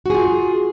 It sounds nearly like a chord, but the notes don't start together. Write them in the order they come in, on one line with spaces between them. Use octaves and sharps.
F#4 G#4 F4